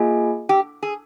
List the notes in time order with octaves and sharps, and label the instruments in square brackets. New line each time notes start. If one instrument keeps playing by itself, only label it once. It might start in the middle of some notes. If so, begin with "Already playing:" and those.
Already playing: [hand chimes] A#3 F4 G#4 D#5 G#5
[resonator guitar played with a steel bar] G4
G#4